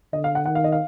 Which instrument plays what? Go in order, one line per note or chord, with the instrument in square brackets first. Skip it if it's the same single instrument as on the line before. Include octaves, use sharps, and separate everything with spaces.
[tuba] D3 [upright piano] D#5
[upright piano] F5
F#5
[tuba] D#3 [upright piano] F#5
[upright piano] F5
D#5
F5